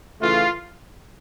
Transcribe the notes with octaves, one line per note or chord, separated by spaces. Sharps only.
C#3 E3 A3 F4